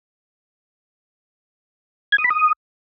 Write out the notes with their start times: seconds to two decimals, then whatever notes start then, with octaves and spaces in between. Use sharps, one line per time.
2.12 G#6
2.18 D#6
2.24 B5
2.30 D#6